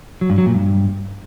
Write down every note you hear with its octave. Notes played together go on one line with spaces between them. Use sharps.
F#3
G2
F#3
A#2
G2